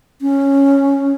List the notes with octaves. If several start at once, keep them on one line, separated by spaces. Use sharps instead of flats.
C#4